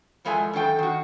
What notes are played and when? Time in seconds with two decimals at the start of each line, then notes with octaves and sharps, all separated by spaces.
0.25 E2 F3 G#3 A4 E5 G#5
0.53 F#2 D#3 A4 G5
0.79 D#3 F#4